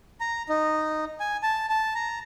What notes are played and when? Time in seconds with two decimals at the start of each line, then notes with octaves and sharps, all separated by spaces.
0.20 A#5
0.49 D#4
1.20 G#5
1.43 A5
1.69 A5
1.95 A#5